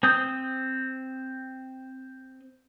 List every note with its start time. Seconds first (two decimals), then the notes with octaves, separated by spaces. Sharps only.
0.03 C4 D#6 G6